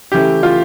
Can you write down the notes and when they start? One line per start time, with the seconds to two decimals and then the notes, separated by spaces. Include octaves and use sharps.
0.12 C#3 E3 A3 G4
0.43 F4